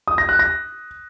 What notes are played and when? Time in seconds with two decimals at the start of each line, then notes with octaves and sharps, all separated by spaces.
0.08 D#6
0.18 A#6
0.29 F#6
0.39 A#6